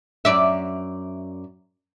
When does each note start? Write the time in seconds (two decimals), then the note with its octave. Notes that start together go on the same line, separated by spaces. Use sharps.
0.25 F#2 D5 E5